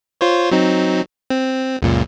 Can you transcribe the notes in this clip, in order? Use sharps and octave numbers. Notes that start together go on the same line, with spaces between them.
F4 C5 C#5
F#3 C4 D#4
C4
C#2 F#2 A#2